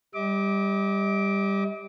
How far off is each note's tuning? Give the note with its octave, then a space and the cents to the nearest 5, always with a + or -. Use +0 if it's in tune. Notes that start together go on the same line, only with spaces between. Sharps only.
G3 +10 D#5 +45 D6 +0